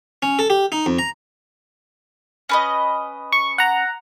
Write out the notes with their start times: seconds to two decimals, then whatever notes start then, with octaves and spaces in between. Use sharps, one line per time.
0.22 C#4
0.39 A4
0.50 G4
0.72 D#4
0.86 F2
0.99 A#5
2.49 C#4 B4 D#5
3.32 C#6
3.58 F#5 A#5